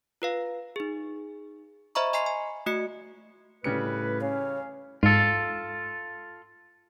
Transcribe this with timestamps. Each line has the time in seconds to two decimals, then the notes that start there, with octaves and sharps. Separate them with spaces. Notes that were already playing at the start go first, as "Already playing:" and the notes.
0.22 F4 B4 F5
0.76 D#4 G#4
1.95 C5 D#5 E5 A#5 B5 C#6
2.13 D#5 G#5 A#5 C6 C7
2.26 G#5
2.66 A3 F#4 D#5 C#7
3.64 A2 C#3 G3 B4 C#7
4.21 C#4 C#5 F5
5.03 G#2 F4 A4